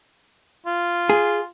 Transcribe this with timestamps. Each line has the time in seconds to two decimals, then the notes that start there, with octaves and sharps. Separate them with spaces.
0.66 F4
1.10 G#4